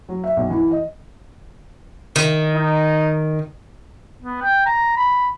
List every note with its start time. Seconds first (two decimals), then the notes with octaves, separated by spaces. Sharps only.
0.09 F#3
0.24 E5
0.37 B1
0.50 E3
0.71 D#5
2.16 D#3
2.56 D#4
4.22 B3
4.42 G5
4.66 A#5
4.96 B5